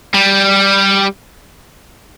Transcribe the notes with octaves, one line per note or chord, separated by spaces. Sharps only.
G3